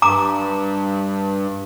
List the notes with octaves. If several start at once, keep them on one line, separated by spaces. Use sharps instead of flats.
G2 A#5 D6